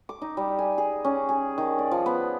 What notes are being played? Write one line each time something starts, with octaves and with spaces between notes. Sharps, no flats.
D6
D#4
G3
G#5
G#4
C#4
G#4
D#3
D5
F3
B3